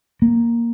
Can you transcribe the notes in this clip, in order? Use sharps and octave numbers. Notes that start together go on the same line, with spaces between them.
A#3